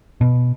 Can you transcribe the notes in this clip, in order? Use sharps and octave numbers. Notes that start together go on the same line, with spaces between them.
B2